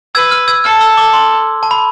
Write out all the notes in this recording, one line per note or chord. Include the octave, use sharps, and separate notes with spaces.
B4 E6 G#6
F6
E6 G#6
A4 F6
E6
D6
C6
A5
B5